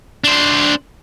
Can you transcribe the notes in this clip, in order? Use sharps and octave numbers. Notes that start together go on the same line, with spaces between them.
D4 C5